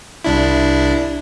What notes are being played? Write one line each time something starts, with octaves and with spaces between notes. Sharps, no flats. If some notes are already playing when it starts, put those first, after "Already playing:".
C2 D4 E4